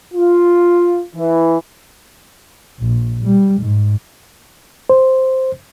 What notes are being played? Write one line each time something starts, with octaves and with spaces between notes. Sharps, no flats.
F4
E3
A#1
G3
G#2
C5